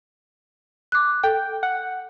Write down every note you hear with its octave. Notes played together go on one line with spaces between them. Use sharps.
D6 F#6
A4 G5
F#5